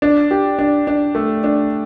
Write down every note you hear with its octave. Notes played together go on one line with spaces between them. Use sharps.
D4
G4
D4
D4
A3
D4